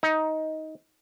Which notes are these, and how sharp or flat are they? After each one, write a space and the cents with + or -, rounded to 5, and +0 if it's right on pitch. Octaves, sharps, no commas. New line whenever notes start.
D#4 +15